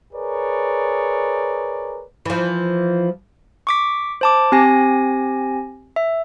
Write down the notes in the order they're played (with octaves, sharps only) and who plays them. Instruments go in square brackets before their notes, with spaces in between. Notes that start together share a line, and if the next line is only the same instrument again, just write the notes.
[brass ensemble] G#4 A#4 B4 C#5 D5
[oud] E3 F3
[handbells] C#6 D6 B6
C5 A5 D6
C4 G4 G#5 A#6
E5